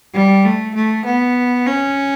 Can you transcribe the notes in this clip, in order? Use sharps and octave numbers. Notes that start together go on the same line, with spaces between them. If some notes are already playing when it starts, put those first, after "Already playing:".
G3
A3
A3
B3
C#4